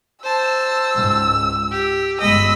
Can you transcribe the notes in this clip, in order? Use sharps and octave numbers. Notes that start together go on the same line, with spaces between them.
C5 A5 E6
C#2 G#2
G4
G1 C#2 G#3 D#5 B5 E6